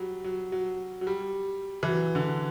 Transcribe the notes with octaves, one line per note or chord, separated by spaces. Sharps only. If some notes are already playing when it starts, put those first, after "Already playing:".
Already playing: F#3 G3
F#3
F#3
F#3
G3
E3
F#3
D3